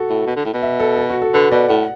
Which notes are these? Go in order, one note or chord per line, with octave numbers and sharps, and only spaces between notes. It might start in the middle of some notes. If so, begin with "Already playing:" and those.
Already playing: F#4 A4
A2
B2
D3
A2
B2
E5
A4
A4
F#4
A4
D3 B4
B2 D5
A2 F#5